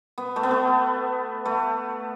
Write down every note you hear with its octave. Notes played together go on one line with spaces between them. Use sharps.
B3
A3
B3
A3
A3